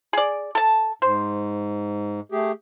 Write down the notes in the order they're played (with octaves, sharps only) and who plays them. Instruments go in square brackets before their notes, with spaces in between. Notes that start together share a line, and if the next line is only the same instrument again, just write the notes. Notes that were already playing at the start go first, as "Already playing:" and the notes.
[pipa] G#4 D5
A4 A5
[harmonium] G#2 [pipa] C5
[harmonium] A3 G4 G#4